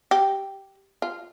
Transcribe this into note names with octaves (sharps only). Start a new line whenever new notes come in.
G4
F4